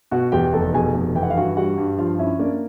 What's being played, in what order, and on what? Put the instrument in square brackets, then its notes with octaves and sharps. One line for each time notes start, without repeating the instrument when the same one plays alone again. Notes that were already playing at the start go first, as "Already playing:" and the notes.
[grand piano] B2 [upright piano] F#4 F#5
[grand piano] E2 [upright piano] G4 G5
[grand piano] F1 [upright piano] A4 A5
[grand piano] B2 [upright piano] G#4 G#5
[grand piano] F1
[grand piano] E3 [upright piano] G5
[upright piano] F#5
F5
[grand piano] G2 [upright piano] F#4 F#5
[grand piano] G3 [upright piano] F#4 F#5
[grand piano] G2
[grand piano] F3 [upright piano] F4 F5
[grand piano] C#4 [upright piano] E4 E5
[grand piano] A#3 [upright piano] D4 D5